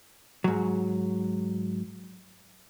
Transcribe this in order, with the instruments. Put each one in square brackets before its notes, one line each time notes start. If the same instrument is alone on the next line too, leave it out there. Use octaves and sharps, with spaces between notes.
[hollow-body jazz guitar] G#2 F#3